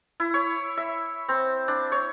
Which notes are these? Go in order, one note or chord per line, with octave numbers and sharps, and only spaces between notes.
E4
C#5
E5
C4
D4
C#5